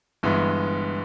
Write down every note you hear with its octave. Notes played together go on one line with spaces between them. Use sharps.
G1 G2 E3 G#3 B3